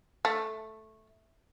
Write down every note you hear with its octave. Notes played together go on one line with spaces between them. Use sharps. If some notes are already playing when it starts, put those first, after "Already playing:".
A3